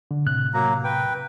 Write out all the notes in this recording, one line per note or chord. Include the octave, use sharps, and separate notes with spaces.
D3
A2 C3 F#6
F#3 A#3 A#5
B4 G5